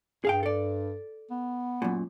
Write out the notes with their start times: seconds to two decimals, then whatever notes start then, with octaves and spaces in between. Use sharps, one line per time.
0.25 G2 G#4 F5 G5
0.43 A4 D5
1.31 B3
1.82 F#2 A#2